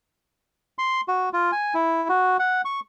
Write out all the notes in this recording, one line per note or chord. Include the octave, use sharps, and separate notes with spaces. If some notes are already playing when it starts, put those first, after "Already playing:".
C6
F#4
F4
G#5
E4
F#4
F#5
C#6